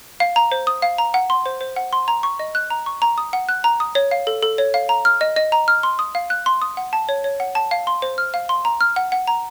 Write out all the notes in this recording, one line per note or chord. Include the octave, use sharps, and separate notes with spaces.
F5
A#5
C5
D#6
F5
A#5
F#5
C6
C5
C5
F#5
C6
A#5
C#6
D#5
F#6
A#5
C#6
A#5
D#6
F#5
F#6
A#5
D#6
C#5
F5
A4
A4
C#5
F5
A#5
F6
D#5
D#5
A#5
F6
C6
D#6
F5
F#6
C6
D#6
F#5
A5
C#5
C#5
F#5
A5
F5
C6
C5
F6
F5
C6
A#5
F6
F#5
F#5
A#5